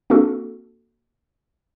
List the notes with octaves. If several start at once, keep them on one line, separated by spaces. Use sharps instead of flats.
A#3 C4 D4 F#4 A4